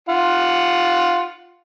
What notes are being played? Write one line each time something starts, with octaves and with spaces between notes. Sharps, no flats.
F4 F#5